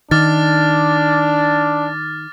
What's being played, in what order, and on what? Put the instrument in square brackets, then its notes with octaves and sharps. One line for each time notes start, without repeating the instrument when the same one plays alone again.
[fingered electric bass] D#3 [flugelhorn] D4 [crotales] D6 F6 A6